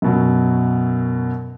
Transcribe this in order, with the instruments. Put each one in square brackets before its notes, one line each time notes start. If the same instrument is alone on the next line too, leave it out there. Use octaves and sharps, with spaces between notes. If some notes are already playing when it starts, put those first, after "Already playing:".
[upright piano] F#2 B2 F#3